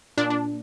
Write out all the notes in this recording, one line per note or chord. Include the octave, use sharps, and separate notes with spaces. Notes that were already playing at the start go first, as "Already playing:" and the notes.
A#2 D4
D4